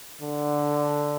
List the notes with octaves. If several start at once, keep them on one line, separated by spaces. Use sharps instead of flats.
D3